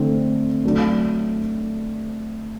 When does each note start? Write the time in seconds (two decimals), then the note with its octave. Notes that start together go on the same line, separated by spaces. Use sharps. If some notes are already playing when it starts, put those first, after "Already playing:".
Already playing: D3 A3 C4
0.64 F#3 A3 D4